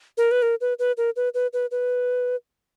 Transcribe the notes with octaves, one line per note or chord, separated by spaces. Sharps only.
A#4
B4
A#4
B4
B4
A#4
B4
B4
B4
B4